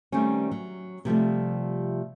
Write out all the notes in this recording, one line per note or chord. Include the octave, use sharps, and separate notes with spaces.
D#3 G3 A3 C4 C#4
F#3
C3 F3 G3 A3